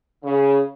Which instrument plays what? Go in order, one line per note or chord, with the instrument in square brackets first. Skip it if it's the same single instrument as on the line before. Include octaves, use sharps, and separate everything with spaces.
[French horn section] C#3